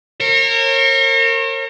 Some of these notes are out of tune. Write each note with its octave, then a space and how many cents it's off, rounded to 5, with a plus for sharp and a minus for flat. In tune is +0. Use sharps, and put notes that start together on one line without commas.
A#4 -25 C#5 -40